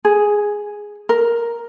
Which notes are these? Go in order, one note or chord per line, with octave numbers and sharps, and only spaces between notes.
G#4
A#4